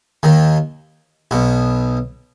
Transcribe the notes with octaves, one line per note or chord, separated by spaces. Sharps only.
D#2 D#3
B1 B2